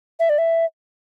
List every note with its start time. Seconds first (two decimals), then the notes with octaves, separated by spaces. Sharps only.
0.20 E5
0.30 D5
0.38 E5